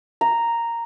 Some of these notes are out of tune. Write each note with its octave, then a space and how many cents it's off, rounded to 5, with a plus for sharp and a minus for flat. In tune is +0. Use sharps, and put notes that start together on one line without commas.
A#5 -5